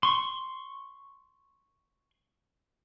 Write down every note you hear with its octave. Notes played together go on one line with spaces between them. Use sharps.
C6 C#6